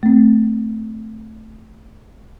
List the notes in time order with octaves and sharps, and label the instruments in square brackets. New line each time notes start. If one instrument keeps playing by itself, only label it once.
[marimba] A3 C4